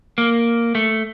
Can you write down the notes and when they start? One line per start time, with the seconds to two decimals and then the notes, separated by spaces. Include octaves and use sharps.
0.18 A#3
0.75 A3